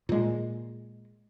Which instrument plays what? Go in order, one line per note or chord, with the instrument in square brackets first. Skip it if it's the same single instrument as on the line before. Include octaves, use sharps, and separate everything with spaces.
[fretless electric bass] A#2 G#3